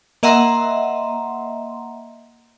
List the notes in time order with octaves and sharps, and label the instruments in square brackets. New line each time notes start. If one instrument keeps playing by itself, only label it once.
[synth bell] A#3 D#5 E5 F#5 A#5 C6